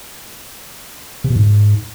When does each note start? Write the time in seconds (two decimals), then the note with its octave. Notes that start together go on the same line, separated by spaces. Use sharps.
1.24 C3
1.30 B2
1.36 G#2